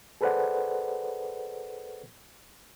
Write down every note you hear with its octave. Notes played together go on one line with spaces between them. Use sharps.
G#4 A4 B4 C5 D5 F#5